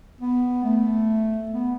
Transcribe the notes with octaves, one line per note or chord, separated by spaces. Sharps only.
B3
A3
B3